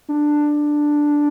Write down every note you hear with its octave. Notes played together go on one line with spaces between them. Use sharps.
D4